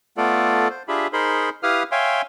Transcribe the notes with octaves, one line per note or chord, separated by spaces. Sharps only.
A3 B3 F4 A4 D5
C5
D4 F4 G4 G#4 E5 B5
D#4 G#4 A#4 C5 B5 C6
E4 G4 B4 F5 D#6 F6
C#5 E5 F5 G5 G#5 C6